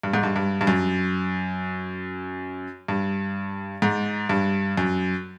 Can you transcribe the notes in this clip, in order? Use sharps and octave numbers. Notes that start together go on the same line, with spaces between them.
G2
G#2
G2
G2
G2
F#2
G2
G#2
G2
F#2